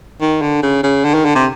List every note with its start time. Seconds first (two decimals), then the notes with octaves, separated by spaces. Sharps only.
0.21 D#3
0.42 D3
0.63 C#3
0.83 C#3
1.04 D3
1.14 D#3
1.25 D3
1.35 C3